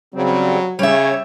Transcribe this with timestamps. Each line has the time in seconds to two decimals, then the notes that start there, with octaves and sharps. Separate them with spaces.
0.14 C#3 F#3 G3 C4
0.79 C#3 G3 C#5 E5